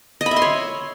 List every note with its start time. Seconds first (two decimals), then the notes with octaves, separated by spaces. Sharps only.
0.21 D#5
0.26 B5
0.31 E5
0.36 C6
0.42 C#5